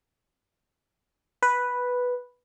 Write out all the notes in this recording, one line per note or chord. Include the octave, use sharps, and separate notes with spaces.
B4